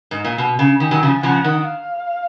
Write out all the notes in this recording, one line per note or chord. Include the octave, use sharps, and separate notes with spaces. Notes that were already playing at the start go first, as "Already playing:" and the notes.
G#2
A#2
B2
C#3
D#3 G#5
D#3 F#3
C#3 F3
C#3 F3 F#5
D#3
F5